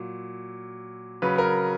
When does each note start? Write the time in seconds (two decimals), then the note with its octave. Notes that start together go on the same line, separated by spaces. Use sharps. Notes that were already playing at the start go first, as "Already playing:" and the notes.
Already playing: A#2 F#3
1.22 C#3 F#3 B4
1.38 A#4